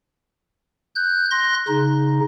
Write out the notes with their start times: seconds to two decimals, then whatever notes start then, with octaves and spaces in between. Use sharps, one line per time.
0.96 F#6 G6
1.31 C6 F#6 A#6
1.68 C#3 D#4